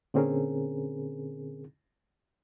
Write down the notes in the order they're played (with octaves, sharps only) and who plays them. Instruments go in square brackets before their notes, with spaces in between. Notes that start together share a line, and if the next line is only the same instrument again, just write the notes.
[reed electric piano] A#2 D3 C4 C#4 G#4 A#4